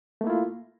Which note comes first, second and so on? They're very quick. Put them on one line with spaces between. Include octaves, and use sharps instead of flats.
A3 A#3 E4 F4